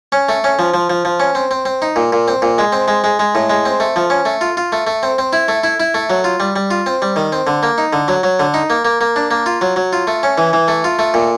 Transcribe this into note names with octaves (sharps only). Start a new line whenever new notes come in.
C#4
A3
C#4
F3
F3
F3
F3
C#4
C4
C4
C4
D#4
A#2
A#2
C4
A#2
G#3
C4
G#3
G#3
G#3
A2
G#3
C4
A3
F3
C#4
A3
F4
F4
A3
A3
C4
C4
E4
A3
E4
E4
A3
F#3
F4
G3
G3
F4
C4
G3
D#3
C4
D3
A#3
D#4
D3
F#3
F#3
D3
D#4
A#3
A#3
A#3
D4
A#3
F4
F#3
F#3
F4
A3
C#4
E3
E3
A3
F4
A3
A#2